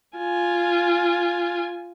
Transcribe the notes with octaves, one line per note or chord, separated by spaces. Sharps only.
F4 G#5